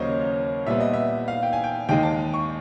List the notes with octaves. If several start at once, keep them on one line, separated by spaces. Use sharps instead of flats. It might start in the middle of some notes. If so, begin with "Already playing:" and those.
Already playing: D#2 C#3 F#3 A#3 C5 C#5 D#5
A#2 G3 B3 E5
D#5
E5
F5
G5
G#5
G5
D#2 D#3 G#3 G5
A5
C#6